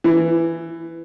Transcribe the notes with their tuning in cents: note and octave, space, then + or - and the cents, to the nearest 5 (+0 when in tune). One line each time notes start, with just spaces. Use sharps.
E3 +10